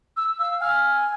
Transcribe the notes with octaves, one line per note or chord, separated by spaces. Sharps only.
E6
F5 E6
G#5 F6